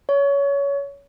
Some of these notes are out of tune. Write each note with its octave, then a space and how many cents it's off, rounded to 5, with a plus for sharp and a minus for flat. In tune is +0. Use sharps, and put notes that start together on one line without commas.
C#5 +20